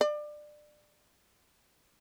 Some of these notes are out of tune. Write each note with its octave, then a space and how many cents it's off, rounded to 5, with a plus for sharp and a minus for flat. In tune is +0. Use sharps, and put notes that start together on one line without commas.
D5 +25